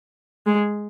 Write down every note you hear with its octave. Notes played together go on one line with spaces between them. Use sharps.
G#3